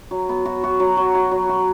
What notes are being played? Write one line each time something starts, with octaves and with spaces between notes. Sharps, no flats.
F#3
B3
F#4
F#4
F#3
F#3
F#4
F#3
F#4